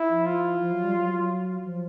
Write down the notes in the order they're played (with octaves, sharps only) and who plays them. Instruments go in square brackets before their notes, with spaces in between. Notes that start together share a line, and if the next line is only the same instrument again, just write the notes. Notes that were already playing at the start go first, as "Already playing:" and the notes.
Already playing: [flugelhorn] E4
[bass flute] F3
[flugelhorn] F4
[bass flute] F3
F#3
G3
F#3
F3